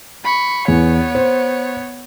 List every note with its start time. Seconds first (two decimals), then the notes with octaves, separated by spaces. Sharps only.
0.25 B5 C#6
0.68 E2 B3 C#5
1.15 C5